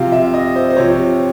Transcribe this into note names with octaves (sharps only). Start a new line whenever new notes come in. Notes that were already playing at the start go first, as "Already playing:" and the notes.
Already playing: C3 F3 F5
E5
D#5
C5
C5
C3 F3 C#5